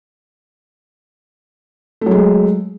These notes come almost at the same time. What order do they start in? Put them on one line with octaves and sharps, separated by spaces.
A3 F#3 G#3